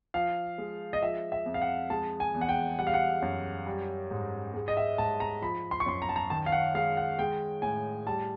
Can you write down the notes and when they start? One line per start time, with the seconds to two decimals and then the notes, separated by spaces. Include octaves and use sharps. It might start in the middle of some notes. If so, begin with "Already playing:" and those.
0.14 F3 F5
0.58 G#3
0.93 D#5
1.02 F3 E5
1.32 E5
1.46 F2
1.54 F5
1.62 F#5
1.90 G#3 A5
2.20 G#5
2.34 E2
2.41 F#5
2.49 G5
2.79 G3 F#5
2.87 F5
2.94 F#5
3.22 F#2
3.67 G3
4.11 G#2
4.54 G#3
4.68 D#5
4.77 E5
4.98 G#2 A5
5.20 A#5
5.42 F3 B5
5.71 C6
5.80 C#6
5.86 F#2 C6
6.02 A#5
6.09 A5
6.16 A#5
6.30 D#3 A5
6.46 F5
6.52 F#5
6.75 G#3 F5
6.97 F#5
7.18 G#3 G5
7.62 A2 G#5
8.06 G3 A5